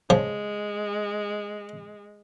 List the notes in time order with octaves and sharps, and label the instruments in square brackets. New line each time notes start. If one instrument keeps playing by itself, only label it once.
[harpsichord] C#3 F3 [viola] G#3